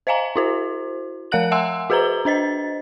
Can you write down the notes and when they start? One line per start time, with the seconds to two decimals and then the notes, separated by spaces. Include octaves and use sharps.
0.07 C5 D#5 F5 G#5 A#5
0.36 E4 F#4 C5
1.32 F3 A#4 F5 F#5 F#6 F#7
1.52 E5 F#5 G#5 C6 E6
1.90 F#4 G#4 B4 C5 A#5 G7
2.25 D4 C5 D#5 A6